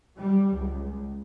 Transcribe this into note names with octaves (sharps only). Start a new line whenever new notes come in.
G3
C#2